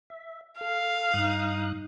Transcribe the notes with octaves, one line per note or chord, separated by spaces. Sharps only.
E5
A4 F5 F6
G2 D#4 D#6 F#6